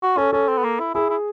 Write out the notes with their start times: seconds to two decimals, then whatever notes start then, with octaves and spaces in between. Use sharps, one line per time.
0.03 F#4
0.17 C#4 A4
0.33 C#4 A4
0.48 C4
0.57 B3
0.64 A#3
0.79 E4
0.94 E4 G#4
1.10 E4